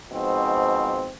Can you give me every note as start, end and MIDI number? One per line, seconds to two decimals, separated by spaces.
0.13 1.11 44
0.13 1.11 47
0.13 1.11 53
0.13 1.11 60